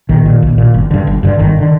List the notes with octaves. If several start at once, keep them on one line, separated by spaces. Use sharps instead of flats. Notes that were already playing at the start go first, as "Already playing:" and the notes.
A#1 D#3
A#2
A#1
A#2
G1
G2 D3
G1
G2 D3
G1 D#3
D3